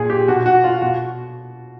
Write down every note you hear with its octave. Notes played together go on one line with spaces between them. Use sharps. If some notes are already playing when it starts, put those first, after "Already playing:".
Already playing: A#2 G#4
G4
B2 F#4
F#4
F4
B2 F#4